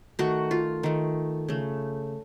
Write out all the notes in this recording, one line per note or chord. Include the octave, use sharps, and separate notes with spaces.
D#3 A3 F#4
F4
D#3 A3
C#3 A3